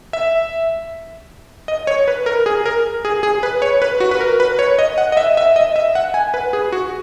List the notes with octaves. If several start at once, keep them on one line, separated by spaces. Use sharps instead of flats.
E5
D#5
C#5
B4
A#4
G#4
A#4
G#4
G#4
B4
C#5
B4
F#4
B4
A#4
B4
C#5
D#5
F#5
D#5
E5
E5
D#5
E5
F#5
G#5
B4
G#4
F#4